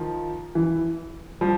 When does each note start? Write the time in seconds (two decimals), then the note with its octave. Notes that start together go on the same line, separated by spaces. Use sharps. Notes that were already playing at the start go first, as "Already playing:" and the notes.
Already playing: D#3 F3
0.55 E3
1.41 F3 G3